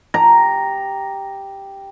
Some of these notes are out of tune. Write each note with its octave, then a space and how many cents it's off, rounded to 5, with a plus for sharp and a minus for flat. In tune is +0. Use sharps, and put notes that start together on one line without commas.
G4 +0 A#5 +0